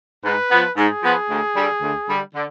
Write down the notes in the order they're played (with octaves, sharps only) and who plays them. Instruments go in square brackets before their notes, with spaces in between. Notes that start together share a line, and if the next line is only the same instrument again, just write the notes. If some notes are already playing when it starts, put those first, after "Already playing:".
[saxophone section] G#2 [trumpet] B4
[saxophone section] F3 B3
[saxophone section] G#2 [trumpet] G#4
[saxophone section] F3 B3
D2
D3 G3
D2
D3 G3
D3